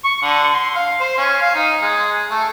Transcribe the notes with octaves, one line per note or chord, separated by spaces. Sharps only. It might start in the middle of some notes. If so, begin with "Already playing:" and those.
C#6
D3
C6
F5
C5
C#4
F5
D#4
G#3
A3